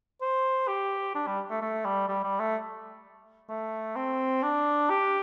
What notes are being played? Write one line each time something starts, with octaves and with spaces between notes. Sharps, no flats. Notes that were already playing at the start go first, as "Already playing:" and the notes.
C5
G4
D4
G3
A3
A3
G3
G3
G3
A3
A3
C4
D4
G4